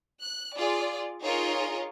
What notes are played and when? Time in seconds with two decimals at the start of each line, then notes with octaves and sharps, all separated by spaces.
0.21 F#6
0.55 F4 G#4 D5
1.25 D#4 F4 G#4 A#4 C#5